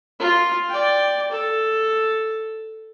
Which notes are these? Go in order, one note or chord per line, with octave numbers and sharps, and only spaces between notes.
F4
D5 G5
A4